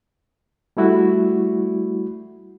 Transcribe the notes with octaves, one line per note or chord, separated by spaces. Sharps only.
G3 A3 E4 F#4